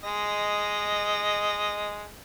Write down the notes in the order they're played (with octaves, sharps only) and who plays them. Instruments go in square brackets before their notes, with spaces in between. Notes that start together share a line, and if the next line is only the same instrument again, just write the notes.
[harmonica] G#3 D#5